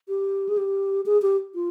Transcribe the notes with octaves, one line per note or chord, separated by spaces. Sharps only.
G4
G#4
G4
G#4
G4
F4